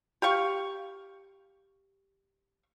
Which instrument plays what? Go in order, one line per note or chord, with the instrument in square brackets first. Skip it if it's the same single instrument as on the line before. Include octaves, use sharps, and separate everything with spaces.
[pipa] G4 F5 C#6